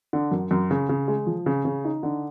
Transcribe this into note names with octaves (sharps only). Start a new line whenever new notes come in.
D3
F#2
F#2
C#3
C#3
G#3
F3
C#3
C#3
D#4
D3